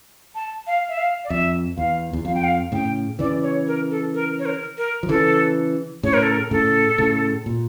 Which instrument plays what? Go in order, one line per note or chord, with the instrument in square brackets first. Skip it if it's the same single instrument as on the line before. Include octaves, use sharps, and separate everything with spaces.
[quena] A5
F5
E5
F5
D5
[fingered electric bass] F2 [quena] E5
[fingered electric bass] E2 [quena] F5
[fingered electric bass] E2
[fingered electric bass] F2 [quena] F5
[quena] G5
F5
[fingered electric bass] A2 C#3 [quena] G5
[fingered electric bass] C#3 E3 [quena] D5
[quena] C#5
A#4
A4
A#4
C#5
A#4
A#4
[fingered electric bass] F3
[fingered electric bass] C#3 E3 [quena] A4
[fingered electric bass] A2 C#3 [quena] C#5
[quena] A#4
A4
A#4
[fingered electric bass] A2 C#3 [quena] A4
[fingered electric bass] A2 C#3
A#2